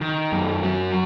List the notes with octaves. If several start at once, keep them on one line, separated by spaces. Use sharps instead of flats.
D#3
F#2
F#3